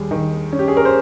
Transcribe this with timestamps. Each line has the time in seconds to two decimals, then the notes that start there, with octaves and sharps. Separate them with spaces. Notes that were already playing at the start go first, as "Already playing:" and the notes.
Already playing: D#2 G3 G#4
0.11 D#3
0.52 C#4
0.59 G4
0.68 G#4
0.77 A#4
0.85 C5